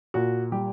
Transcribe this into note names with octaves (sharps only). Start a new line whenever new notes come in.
A#2 F#4
G3 G4